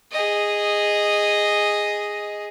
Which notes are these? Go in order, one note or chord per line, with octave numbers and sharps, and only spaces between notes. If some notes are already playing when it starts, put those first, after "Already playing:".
G#4 D#5